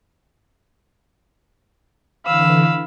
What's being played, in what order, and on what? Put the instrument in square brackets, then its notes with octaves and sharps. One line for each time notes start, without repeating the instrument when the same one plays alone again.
[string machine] D3 E3 [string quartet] F5 B5 E6